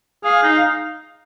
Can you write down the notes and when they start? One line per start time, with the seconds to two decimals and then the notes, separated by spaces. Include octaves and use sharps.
0.24 G#4 F5
0.43 D#4